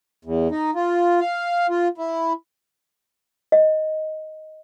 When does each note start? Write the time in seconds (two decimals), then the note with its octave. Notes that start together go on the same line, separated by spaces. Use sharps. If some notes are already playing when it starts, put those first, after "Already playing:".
0.25 E2
0.51 D#4
0.75 F4
1.20 F5
1.70 F4
1.98 E4
3.52 D#5